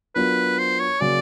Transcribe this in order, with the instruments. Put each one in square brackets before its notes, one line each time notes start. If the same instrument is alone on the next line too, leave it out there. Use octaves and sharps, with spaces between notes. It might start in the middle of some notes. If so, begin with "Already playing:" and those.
[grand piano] F#3 B3 D4 F4 A#4 [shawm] B4
[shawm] C5
C#5
[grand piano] C#3 F#3 A#3 C#4 F#4 [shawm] D5